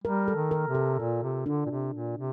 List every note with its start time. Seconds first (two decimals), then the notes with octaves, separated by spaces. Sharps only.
0.04 G3 A#4
0.28 A4
0.36 D#3
0.51 A#4
0.67 C3
0.75 A4
0.99 A#2 F4
1.23 C3
1.46 D3 D4
1.66 A#2
1.70 C3
1.94 A#2
2.17 C3